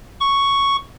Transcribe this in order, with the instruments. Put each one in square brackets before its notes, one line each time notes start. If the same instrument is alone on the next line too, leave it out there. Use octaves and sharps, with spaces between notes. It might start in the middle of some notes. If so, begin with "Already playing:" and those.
[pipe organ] C#6